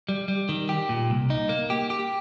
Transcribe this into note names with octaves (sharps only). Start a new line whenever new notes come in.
G3
G3
D#3
G4
A#2
C2
D#4
A#3
G4
G4